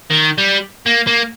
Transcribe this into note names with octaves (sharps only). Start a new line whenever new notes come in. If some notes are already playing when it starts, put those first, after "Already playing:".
D#3
G3
A#3
A#3